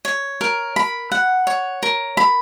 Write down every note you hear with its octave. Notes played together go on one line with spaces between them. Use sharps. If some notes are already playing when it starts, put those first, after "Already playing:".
C#5
A#4
B5
F#5
C#5
A#4
B5